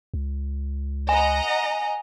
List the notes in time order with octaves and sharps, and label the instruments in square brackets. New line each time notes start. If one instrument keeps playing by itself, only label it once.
[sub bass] C#2
[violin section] D#5 F#5 A#5 [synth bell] G#5